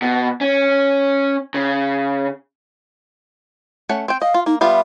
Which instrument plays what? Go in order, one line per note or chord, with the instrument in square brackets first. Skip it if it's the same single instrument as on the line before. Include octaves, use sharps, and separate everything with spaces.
[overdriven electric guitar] B2
C#4
C#3
[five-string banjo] A3 C#4 F#5
C4 G5
[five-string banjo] D#5 [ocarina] F5
[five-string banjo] F4
[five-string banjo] A#3 [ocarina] D#4
[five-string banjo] G3 B3 F4 [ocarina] E5